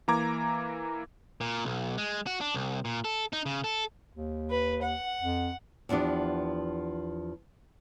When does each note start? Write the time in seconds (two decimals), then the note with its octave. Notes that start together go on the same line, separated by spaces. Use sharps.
0.08 E3 A#3 A#5 D6 G#6
1.41 A#2
1.65 B1
1.98 G#3
2.27 F#4
2.41 D4
2.54 C2
2.85 A#2
3.04 A4
3.33 D#4
3.46 C#3
3.64 A4
4.15 D#2
4.50 B4
4.82 F#5
5.21 F2
5.89 E2 F3 B3 D4 G4